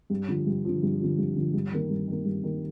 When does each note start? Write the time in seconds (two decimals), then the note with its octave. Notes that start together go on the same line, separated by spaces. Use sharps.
0.10 G2
0.28 D3 F3
0.47 G2
0.65 D3 F3
0.82 G2
1.01 D3 F3
1.18 G2
1.36 D3 F3
1.54 G2
1.72 D#3 A#3
1.90 G2
2.08 D#3 A#3
2.25 G2
2.43 D#3 A#3